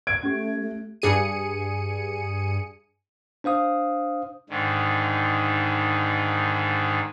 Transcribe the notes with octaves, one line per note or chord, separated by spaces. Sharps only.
G#6 D7
A3 C#4 G4
A3
G2 G#4 C#7 D#7
D4 C5 F5 D#6
G#2 D3 D#3